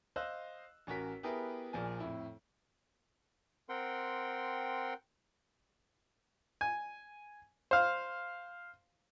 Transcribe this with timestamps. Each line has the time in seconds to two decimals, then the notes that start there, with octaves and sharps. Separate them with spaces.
0.16 C5 D#5 F5 E6 F#6
0.87 A1 C#4 F#4 A#4 B6
1.23 B3 E4 G4 G#4 A#4 B4
1.73 A#1 A#2 F3 A#4 G#5
2.00 F2 A2 E4
3.69 C4 A#4 F#5 G5 C6
6.61 G#5
7.71 C5 F5